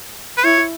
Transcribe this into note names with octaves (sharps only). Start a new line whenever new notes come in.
B4
E4 C#5